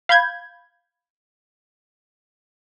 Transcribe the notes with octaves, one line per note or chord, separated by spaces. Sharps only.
F5 B5 G6 G#6